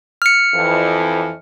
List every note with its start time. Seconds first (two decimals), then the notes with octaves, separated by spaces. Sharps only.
0.22 F6 C#7
0.54 F2 E3